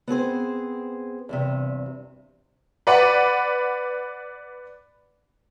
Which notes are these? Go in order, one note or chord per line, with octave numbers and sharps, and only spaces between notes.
B3 C4 G#4 C5
E2 G2 C3
B4 D5 F#5 B5